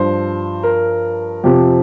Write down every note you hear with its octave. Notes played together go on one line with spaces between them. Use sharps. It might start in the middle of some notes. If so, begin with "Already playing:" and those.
Already playing: G2 F3 C5
A#4
F2 C3 F3 G4